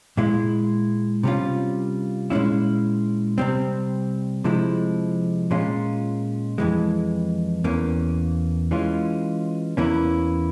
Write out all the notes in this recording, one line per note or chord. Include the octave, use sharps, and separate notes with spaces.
A#2 G#3 E4
C3 G3 C#4 F4
A#2 G#3 C#4 E4
C3 G3 C4
C3 F3 G#3 E4
A#2 G#3 C#4 F4
F2 E3 G#3
E2 E3 A#3 C#4
E3 G#3 C#4 F4
E2 E3 A#3 C#4 E4